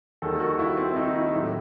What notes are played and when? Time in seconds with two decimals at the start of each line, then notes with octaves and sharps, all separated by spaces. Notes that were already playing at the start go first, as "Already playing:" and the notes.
0.22 D#2 D#3 G3 A4
0.40 F#4
0.59 E4
0.77 C4
0.96 D#4
1.14 E4
1.32 A2 F#3 G4